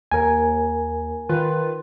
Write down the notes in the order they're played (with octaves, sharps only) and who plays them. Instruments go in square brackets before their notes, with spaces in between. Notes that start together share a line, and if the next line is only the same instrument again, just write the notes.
[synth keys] D#2 [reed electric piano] A#4 G#5
[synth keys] D#3 F4 B4